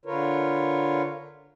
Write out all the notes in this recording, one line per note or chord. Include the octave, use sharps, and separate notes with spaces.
D3 F4 A#4 B4 C#5